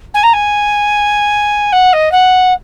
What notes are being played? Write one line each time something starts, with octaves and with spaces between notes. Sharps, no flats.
G#5
A#5
G#5
F#5
D#5
F#5